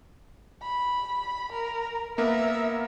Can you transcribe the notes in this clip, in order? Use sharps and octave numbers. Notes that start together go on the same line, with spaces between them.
B5
A#4
A#3 B3 A#4 E5